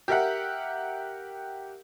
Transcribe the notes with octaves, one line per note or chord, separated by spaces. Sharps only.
G4 A#4 E5 F#5